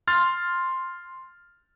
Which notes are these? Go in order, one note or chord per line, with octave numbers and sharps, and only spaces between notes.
C6 F6 A6